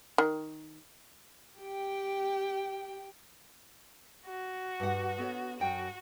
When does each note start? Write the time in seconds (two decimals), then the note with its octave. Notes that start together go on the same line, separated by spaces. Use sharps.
0.18 D#3
1.59 G4 G5
4.26 F#4
4.80 G2 F#5
5.18 B3 A4 C#5
5.60 F#2 F#4 G5